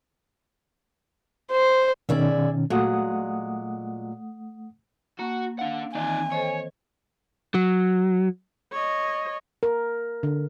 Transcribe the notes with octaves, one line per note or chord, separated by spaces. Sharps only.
C5
B2 D#3 C#4 G#4 D5 E5
A#2 F#3 G#3 A3 F#5 D#6
A#3 F#4 A5
D4 F5 F#5
D#3 E3 C4 D#4 D5 G#5
A4 C5 C#5 D#5
F#3
C#5 D#5
A#4
D3